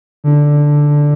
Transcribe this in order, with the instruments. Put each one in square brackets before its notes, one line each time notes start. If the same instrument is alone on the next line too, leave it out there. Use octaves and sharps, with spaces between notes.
[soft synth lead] D3